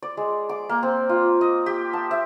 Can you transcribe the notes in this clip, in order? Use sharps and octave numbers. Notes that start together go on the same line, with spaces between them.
D5
G#3
D6
A#3
C4
F4
D#5
G4
A5
E5